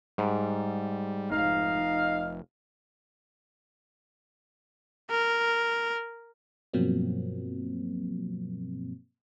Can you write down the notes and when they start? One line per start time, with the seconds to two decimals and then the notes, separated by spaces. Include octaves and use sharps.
0.18 G#2 G3
1.31 F1 D#4 F5
5.11 A#4
6.73 G2 B2 F3 F#3 A#3 C4